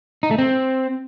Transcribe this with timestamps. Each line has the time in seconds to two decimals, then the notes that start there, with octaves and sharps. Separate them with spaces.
0.23 D#4
0.31 A3
0.38 C4